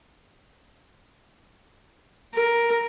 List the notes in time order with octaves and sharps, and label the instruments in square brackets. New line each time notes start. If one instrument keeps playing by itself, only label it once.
[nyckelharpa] A#4